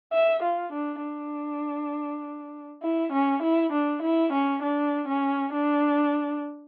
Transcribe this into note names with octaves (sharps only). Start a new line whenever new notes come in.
E5
F4
D4
D4
E4
C#4
E4
D4
E4
C#4
D4
C#4
D4